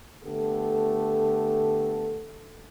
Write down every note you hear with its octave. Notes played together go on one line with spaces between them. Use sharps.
D3 A3 B3 G4 A4